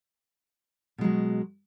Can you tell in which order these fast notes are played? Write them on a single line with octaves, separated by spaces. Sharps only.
B2 G#3 F#3